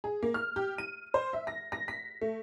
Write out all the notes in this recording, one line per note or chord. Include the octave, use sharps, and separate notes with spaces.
G#4
A#3
F6
G4
D#7
C5
E5
A#6
A#6
B6
A3